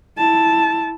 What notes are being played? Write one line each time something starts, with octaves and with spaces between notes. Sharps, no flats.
E4 A5